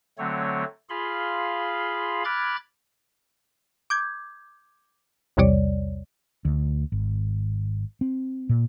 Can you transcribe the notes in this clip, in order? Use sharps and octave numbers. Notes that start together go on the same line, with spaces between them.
D3 F#3 A3 C4 C#5
F4 G#4 F5 B5 C6
B5 D6 F6 F#6 G#6 A6
D6 G6 G#6
B1 E2 C3 G3 C#5 D5
D2
G#1
C4
A#2